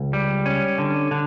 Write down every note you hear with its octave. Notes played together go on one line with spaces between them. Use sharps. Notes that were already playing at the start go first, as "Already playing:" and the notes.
Already playing: C#2
G3
C#4
D3
D3